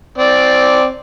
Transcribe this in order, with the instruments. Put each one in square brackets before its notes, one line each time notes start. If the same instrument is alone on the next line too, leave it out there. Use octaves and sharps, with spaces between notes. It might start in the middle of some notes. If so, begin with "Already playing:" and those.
[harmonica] C4 D5